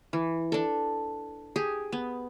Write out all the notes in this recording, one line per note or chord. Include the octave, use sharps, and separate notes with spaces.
E3
D4 A4
G4 G#4
B3